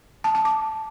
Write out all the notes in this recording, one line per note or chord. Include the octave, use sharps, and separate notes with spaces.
A5
A5
D6